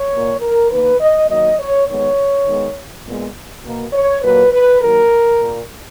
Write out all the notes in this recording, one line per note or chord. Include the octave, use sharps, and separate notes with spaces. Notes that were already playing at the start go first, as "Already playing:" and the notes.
Already playing: C#5
A#2 A#3
A#4
D#3 A#3 B4
D#5
D#3 F#3 A#3 D#5
C#5
D#3 G#3 B3 C#5
D#3 G#3 B3
A#2 G#3 B3
B2 A#3
C#5
A#2 F#3 A#3 B4
B4
D#3 F#3 A#3 A#4
A#2 A#3